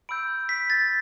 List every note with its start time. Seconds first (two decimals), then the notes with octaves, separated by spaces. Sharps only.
0.09 B5 E6 G6 D7
0.49 B6
0.70 A6